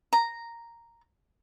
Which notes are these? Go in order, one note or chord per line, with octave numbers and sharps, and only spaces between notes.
A#5